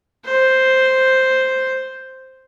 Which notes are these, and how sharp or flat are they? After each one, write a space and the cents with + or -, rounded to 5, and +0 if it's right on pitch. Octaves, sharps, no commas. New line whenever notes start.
C5 +0